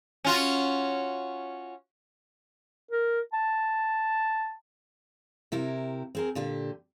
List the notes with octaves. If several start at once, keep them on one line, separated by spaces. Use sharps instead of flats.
C#4 F4 F#4
A#4
A5
C3 E4 G4 A#4
C4 G#4 A#4
A#2 D3 G4